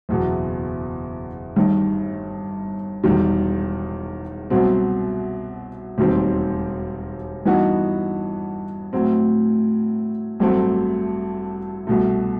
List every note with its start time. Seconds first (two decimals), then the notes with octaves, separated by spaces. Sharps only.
0.09 F#1 E2 B2
1.56 G1 G2 D#3
3.04 E1 E2 D#3 G3
4.50 C2 B2 F#3 C4
5.98 E1 D#2 D#3 G3 C4
7.46 G2 E3 B3 D#4 F#4
8.93 A2 F#3 C4
10.40 A1 G2 F#3 A3 C4
11.87 C2 B2 A3